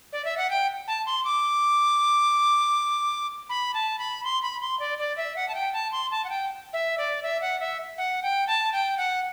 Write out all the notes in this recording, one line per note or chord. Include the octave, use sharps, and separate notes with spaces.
D5
E5
F#5
G5
A5
C6
D6
B5
A5
B5
C6
B5
C6
D5
D5
E5
F#5
A5
G5
A5
C6
A5
F#5
G5
E5
D5
E5
F#5
E5
F#5
G5
A5
G5
F#5